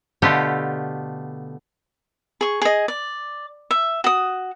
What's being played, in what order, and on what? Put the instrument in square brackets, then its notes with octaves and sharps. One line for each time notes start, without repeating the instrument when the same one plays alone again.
[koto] B2 D3 A3 B3 F4 G4
[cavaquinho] G#4 C#6
G#4 D#5
D5
E5
F#4 D#6